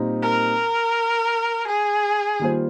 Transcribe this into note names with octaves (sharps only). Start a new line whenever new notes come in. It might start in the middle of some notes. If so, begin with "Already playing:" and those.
Already playing: A#2 G3 C4 D#4
A#4
G#4
D#3 G3 A#3 F4 C5